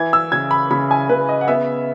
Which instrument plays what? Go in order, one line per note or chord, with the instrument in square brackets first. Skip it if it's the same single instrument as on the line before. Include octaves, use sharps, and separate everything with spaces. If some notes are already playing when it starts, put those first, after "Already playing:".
Already playing: [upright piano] E3 G#6
E6
C#3 G#6
B5
C#3 B5
G#5
C#3 B4
D#5
F#5
B3 E5